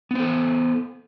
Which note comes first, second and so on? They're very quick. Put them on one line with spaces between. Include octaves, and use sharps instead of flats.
B3 C5 A4